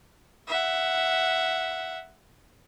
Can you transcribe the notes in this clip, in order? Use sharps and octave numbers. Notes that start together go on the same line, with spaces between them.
E5 F#5